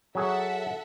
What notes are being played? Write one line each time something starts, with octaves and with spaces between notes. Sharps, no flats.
F#3 G#4 A4 E5 F#5